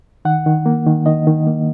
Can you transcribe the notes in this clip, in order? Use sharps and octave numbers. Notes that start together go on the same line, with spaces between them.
D#3 F#5
D#3
A#3
D#3
D#3 D#5
D#3
A#3